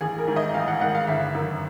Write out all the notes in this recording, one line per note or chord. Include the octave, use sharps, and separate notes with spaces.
A1 G#4
A#4
G#2 D#3
D#5
A1 F5
F#5
G#2 D#3 F#5
F5
G1 E5
F#2 D#3